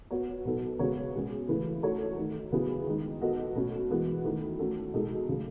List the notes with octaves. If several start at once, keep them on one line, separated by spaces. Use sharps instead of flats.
B3 F#4 C#5
B2 F#3 B3 D#4 A4
C#3 G#3 B3 F#4 C#5
B2 G#3 C#4 G#4
C#3 E3 A3 E4 B4
A3 D#4 F#4 A4 C#5
D#3 A3 D#4
C#3 F#3 B3 E4 G#4
D#3 G#3 D#4
B3 F#4 A4 D#5
B2 A3 C#4 F#4
E3 G#3 B3 F#4
D#3 A3 E4
A3 C#4 F#4 A4
B2 G#3 D#4 A4
C#3 F#3 A3